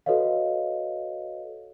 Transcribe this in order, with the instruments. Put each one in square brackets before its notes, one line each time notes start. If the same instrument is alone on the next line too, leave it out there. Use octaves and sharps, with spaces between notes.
[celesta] F#4 A4 B4 C#5 D#5 F5